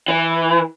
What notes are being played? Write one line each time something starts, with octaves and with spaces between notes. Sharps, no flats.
E3